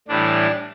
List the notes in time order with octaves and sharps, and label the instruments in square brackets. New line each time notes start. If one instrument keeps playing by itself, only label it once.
[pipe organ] A2 E3 G3 D4